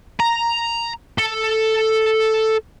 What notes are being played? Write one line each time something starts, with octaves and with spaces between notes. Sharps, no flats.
A#5
A4